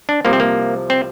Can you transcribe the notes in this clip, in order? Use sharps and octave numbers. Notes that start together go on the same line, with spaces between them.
D4
C2 C3 F3 A#3
C4
A#3
C4